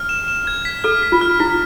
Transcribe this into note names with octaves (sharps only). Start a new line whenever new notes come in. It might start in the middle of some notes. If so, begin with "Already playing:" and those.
Already playing: F6
E7
E7
G#6
B6
A4 F6
B6
F4
F6
E4 B6